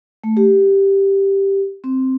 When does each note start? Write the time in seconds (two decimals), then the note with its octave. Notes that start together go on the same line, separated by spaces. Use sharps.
0.24 A3
0.37 G4
1.84 C4